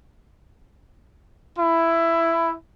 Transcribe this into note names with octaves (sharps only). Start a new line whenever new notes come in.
E4